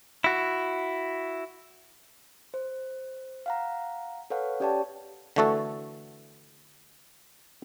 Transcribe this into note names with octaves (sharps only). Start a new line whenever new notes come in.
E4 F#4
C5
F5 F#5 A#5
A4 B4 C#5 F5 F#5
C#4 G4 C#5 D5 G5 A5
D3 E3 A3 F#4 A4